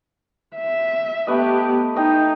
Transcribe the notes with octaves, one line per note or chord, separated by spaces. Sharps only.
E5
A3 B3 G4 B4 D#5
D#4 D#5 G5